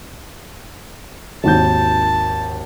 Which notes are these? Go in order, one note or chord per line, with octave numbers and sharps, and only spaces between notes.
G#1 D#2 A5 G6